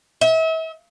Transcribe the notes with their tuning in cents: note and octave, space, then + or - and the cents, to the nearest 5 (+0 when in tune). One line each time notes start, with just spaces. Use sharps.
E5 -40